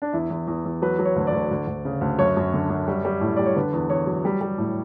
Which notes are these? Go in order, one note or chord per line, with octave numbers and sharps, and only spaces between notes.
D4
E2 E4
E2
E2
E2
F#3 B4
F#3
C#5
D2
D5
D2
D2
D2
C#3
D2
F#2 C#5
F#2
D3
F#2
G3
G3
A2
G3 D5
C#5
D3 B4
E2
E2 C#5
F#3
G3
G3
A2